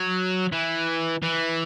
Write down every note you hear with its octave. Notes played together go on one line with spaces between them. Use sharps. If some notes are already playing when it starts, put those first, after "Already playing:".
Already playing: F#3
E3
E3